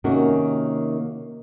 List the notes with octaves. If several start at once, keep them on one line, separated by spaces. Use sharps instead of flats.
C3 D#3 A#3 C#4 F#4 A#4